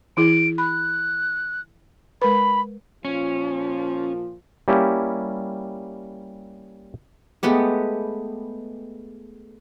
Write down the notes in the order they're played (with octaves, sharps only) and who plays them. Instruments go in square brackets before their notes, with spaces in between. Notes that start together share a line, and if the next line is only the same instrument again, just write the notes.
[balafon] E3 E4 G#4 [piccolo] D7
[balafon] B5 [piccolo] F#6
[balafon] G#3 A#4 B4 [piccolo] B5
[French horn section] A#2 F3 F4 [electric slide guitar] C#4
[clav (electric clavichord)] G3 A#3 C#4 E4 G4
[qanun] G#3 A3 B3 G4